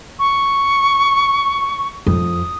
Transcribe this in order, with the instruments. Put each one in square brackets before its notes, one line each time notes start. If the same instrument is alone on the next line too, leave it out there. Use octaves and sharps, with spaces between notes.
[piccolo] C#6
[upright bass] F2 [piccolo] D#6